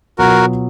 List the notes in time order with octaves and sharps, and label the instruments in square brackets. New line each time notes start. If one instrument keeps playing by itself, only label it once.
[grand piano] B2 F#3 B3 F4 [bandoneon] F#4 A#4